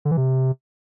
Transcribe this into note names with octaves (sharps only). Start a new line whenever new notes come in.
D3
E3
C3